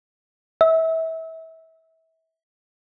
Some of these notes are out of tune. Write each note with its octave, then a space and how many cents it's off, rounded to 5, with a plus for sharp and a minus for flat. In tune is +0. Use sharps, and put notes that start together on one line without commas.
E5 -30